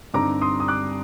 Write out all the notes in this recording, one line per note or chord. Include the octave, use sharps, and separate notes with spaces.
G2 D3 G3 C4 D#4 A#5 D6
C6 D#6
D#6
D6 F#6